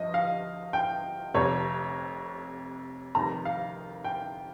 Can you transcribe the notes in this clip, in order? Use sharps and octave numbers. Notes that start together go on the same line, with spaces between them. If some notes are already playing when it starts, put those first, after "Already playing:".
Already playing: G1 G2 F3 D#5
F5
G5
F1 F2 C3 C#5
F1 F2 D#3 G3 A#5
F5
G5